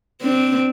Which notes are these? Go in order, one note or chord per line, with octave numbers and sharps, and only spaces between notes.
C4 D4